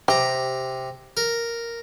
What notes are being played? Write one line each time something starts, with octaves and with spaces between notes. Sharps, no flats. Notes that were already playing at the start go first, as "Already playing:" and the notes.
C3 G4 A#5
A#4